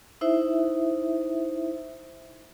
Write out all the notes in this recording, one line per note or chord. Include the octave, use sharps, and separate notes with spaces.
D#4 E4 C5 E5